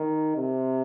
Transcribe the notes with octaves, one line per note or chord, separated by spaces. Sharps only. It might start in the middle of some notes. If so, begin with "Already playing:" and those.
Already playing: D#3
C3